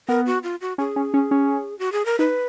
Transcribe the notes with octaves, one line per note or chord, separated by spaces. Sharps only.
B3 A#4
F#4
F4
F#4
C#4 G#4
C#4
C#4
C#4
F#4
G#4
A#4
D#4 B4